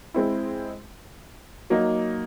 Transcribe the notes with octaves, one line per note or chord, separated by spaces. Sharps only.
G#3 C4 E4
F#3 A#3 D#4